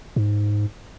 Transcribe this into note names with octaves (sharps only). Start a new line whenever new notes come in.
G#2